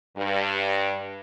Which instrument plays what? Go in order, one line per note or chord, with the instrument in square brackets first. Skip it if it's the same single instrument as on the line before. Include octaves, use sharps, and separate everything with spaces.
[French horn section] G2